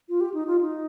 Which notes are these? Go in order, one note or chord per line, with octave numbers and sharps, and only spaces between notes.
F4
G4
D#4
F4
D#4